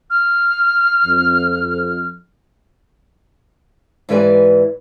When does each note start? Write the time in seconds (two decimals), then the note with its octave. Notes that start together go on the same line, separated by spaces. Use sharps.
0.10 F6
1.05 F2
4.09 G#2 E3 G4 B4 D5 G#5